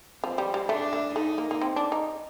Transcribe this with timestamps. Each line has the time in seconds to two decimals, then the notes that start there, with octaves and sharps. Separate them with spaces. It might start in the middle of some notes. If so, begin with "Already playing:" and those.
0.24 F3 C4
0.38 G3
0.54 G3
0.69 A3 D4
0.93 A3
1.15 A3 D#4
1.38 A#3
1.51 A#3
1.62 C4
1.76 D4
1.92 D#4